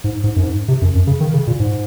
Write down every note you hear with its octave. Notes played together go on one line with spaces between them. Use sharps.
G#2
G#2
F#2
G#2
C3
F#2
F#2
C#3
D#3
C#3
A#2
G#2